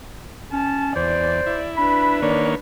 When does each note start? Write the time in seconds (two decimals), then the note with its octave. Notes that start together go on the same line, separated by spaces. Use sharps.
0.52 C#4 A5
0.96 E2 C5 D5
1.46 E4
1.77 D4 B4 B5
2.22 D#3 A#3 C#5 D5